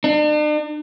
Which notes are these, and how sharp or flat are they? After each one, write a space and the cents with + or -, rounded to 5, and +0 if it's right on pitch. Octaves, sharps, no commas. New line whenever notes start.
D4 +45